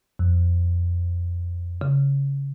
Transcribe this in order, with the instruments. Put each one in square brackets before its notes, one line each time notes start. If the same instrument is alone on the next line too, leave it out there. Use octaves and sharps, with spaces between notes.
[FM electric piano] F2
[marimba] C#3